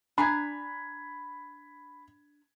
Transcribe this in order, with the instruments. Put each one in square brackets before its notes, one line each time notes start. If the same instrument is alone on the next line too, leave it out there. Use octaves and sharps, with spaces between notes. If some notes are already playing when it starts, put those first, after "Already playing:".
[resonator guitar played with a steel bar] D4 G#5 A#5 [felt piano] B5 G#6